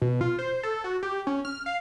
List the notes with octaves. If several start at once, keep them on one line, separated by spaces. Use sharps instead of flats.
B2
F4
C5
A4
F#4
G4
C#4
F6
F5